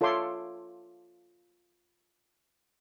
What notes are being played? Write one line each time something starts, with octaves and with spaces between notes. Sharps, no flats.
F4 A4 C#5 E5 C6 D6